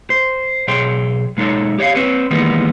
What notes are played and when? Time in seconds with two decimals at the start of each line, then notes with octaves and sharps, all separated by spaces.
0.10 C5
0.68 B1 G#4 C#5 G5 C6
1.37 B1 G#3 D#4 A4 C#5
1.78 G4 C#5 D5 F5
1.95 C4 B4 C#5
2.31 D#3 E3 G3 G#3 A#3 B3